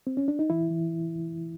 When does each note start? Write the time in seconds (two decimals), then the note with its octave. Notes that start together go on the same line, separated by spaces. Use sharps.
0.07 C4
0.17 C#4
0.28 D4
0.39 D#4
0.50 E3 E4
0.70 E3